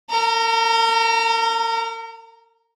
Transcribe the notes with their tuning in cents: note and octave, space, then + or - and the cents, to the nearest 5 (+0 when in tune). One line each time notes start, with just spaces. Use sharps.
A#4 -45 A#5 +0